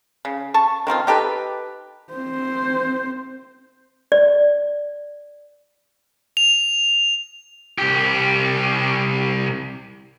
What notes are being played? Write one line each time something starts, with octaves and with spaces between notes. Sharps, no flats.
C#3
A5 C#6
D#3 F3 C4 F4
D#4 G4 A4 B4
C4 C5
D5
F7
C2 G4